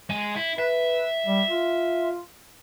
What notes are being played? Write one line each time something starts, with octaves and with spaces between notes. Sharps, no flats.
G#3 G#5
E4
B4 E5
G3
F4